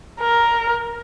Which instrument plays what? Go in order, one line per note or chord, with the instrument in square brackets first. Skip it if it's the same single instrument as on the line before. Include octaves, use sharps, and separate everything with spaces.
[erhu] A#4